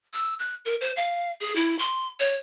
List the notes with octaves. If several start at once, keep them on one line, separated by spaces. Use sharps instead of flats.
E6
F#6
A#4
C5
F5
G#4
E4
C6
C#5